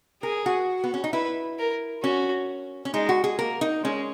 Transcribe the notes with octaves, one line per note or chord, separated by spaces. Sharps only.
G#4 A#4
F#4
B3
C#4
D#4
E4 B4
A#4
C#4 F#4
C#4
G#3 D#4
F#4
G#4
A#3 A#4
D#4
G#3 C#4